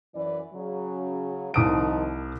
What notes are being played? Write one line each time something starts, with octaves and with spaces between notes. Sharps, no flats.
F#2 E3 D5
C#3 F#3
C2 D#3 F3 D#4 D#6 D7